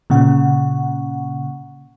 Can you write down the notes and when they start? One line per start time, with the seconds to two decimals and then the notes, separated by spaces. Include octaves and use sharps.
0.10 A#2 C#3 F#5